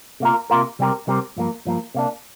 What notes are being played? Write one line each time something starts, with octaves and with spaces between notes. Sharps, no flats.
C3 A#3 F4 A#4
C3 A#3 F4 A#4
C3 G3 C4 G4 A#4
C3 G3 C4 G4 A#4
G2 F3 A#3
G2 F3 A#3
C3 A#3 D4